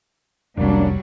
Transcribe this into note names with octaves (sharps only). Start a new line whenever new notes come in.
F1 C2 F#3 G3 A#3 C#4 D4